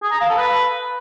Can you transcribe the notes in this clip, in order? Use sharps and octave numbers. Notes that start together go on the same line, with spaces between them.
G#4
A#5
F5
A4
B4